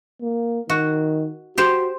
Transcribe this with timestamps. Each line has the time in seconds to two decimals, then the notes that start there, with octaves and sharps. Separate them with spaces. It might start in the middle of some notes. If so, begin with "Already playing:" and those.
0.22 A#3
0.70 D#3 F#4
1.58 F#4 G4 C5